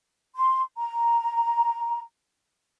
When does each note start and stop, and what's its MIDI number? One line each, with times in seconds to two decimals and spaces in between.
0.36 0.61 84
0.77 2.01 82